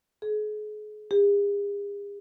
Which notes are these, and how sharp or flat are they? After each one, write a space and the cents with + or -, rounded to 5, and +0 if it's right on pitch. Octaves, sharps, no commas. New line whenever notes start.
G#4 +40
G#4 -45